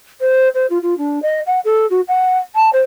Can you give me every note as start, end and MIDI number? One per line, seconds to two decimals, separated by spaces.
0.20 0.48 72
0.54 0.66 72
0.70 0.78 65
0.82 0.97 65
0.97 1.19 62
1.22 1.40 75
1.46 1.59 78
1.64 1.86 69
1.90 2.00 66
2.07 2.37 78
2.55 2.69 81
2.72 2.81 72